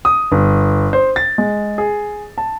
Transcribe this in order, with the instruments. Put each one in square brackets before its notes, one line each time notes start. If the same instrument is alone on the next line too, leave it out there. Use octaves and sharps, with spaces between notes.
[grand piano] D#6
G1
C5
A6
G#3
G#4
A5